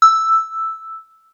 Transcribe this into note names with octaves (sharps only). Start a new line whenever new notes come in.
E6